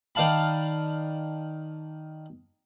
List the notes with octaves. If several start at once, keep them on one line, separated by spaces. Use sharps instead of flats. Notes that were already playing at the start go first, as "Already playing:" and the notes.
D#3 D5 F5 A5 B5